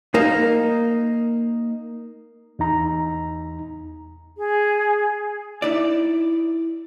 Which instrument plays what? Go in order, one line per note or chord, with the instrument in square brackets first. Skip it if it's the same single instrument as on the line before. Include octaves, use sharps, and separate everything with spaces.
[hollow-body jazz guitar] A#3 D#4
[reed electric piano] E2 D#4 A#5
[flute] G#4
[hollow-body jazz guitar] D#4 E4 D5